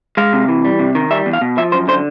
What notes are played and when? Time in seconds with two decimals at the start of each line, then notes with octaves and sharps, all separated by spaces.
0.17 G#3 F5
0.33 C3
0.48 E3
0.65 G3
0.79 C3
0.95 D#3
1.11 G3 E5
1.26 E2
1.33 F5
1.41 B2
1.58 F3 E5
1.72 F#2 C5
1.88 D3 C5